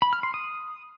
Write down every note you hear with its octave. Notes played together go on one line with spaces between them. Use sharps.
B5
F6
C6
D#6